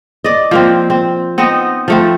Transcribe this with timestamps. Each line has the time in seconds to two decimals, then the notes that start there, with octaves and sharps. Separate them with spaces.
0.24 D5 D#5
0.51 F3 A#3 C4
0.90 C4
1.38 B3 C4 D#4 D#5
1.88 F3 A3 C4